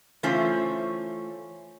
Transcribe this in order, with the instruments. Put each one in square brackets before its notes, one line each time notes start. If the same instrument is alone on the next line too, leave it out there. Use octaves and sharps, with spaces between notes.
[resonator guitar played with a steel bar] E3 A3 C#4 F4 C5